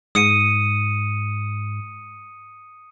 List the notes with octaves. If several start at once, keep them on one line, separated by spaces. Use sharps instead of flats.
G#2 D#6 C#7 D#7